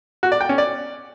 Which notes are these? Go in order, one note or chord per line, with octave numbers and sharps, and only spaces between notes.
F#4
D5
G5
C#4
D5